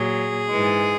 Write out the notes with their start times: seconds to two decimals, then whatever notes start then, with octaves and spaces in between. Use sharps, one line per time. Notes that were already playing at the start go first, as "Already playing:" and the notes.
Already playing: A#2 F#3 G#4
0.49 G#2 E3 G#3